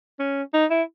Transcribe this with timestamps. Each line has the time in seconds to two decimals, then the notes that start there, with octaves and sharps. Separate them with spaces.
0.19 C#4
0.53 D#4
0.70 E4